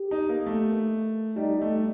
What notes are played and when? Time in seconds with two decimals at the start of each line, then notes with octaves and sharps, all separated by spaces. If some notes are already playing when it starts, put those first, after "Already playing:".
Already playing: G4
0.11 D#4
0.29 A#3
0.46 A3
1.36 G3 D#4
1.61 A3